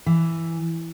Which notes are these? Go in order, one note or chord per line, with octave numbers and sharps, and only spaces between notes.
E3